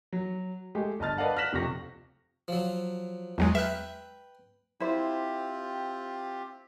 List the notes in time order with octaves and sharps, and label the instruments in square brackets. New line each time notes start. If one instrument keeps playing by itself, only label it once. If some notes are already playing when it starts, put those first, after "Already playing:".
[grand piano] F#3
G#3 A3 G4
G1 D#5 A5 F6 A6
B4 D5 D#5 F5 F#5 A5
F6 F#6 A#6 B6 E7 F#7
F1 C3 F3 C#6 A#6
[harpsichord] F3 F#3
[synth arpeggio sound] E2 F#3 G#3
[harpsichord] B4 G5 [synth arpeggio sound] E5 F6 F#6
[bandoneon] C4 F4 G4 [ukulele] E4 C5